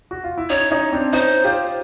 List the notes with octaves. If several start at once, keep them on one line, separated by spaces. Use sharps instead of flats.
F#4
F4
E4
C#4 D#4 C#5
C#4 D#4
C4 D4
C#4 D#4 C5
F4 G4